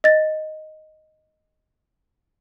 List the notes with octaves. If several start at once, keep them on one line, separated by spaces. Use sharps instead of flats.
D#5 A6